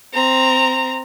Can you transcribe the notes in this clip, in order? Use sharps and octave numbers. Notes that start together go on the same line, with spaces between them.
C4 A#5